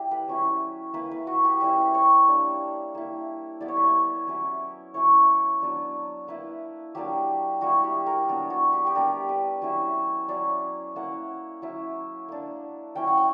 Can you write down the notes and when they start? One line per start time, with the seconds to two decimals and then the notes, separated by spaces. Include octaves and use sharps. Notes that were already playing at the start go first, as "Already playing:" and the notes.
Already playing: G3 E4 G4
0.11 B4
0.28 F#3 C#4 E4
0.94 A#3 E4 B4
1.11 B4
1.27 F#4
1.44 G4
1.61 G3 C#4 E4 B4
1.94 C#5
2.27 A#3 D4
2.95 A#3 E4
3.61 G3 B3 E4 D5
3.68 C#5
3.76 B4
3.84 C#5
4.27 F#3 C#4 E4
4.94 F#3 C#4 E4 C#5
5.62 F#3 B3 D4
6.28 A#3 E4 B4
6.95 F#3 A#3 D4 G4
7.61 G3 A#3 E4 F#4
7.84 G4
8.06 A#4
8.29 F#3 B3 D4
8.50 F#4
8.73 G4
8.87 G4
8.95 G3 B3 D4 A#4
9.29 B4
9.62 F#3 C#4 E4
10.28 F#3 C#4 E4 D5
10.96 A#3 C#4 E4 F#5
11.62 F#3 C#4 E4
12.29 A#3 D4
12.95 F#3 C#4 E4 G5
13.07 F#5
13.17 G5